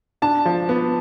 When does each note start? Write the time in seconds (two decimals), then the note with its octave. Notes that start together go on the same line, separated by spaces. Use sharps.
0.22 D4 A5
0.45 F3
0.69 B3